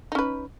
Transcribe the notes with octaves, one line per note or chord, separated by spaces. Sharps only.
C#4 D#4 B4